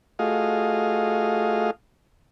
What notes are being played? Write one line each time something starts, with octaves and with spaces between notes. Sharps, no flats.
A3 F4 F#4 G#4 D#5 F5